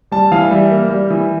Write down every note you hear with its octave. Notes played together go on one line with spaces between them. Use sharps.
G3 A5
E3 F5
G3 E5
A#3
G3
E3